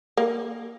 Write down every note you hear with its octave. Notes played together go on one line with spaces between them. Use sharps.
A#3